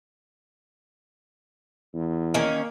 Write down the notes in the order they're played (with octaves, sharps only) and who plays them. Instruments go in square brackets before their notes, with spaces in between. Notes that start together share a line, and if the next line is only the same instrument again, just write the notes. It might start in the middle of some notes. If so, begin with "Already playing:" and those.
[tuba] E2
[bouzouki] D#3 C#4 [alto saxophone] A#3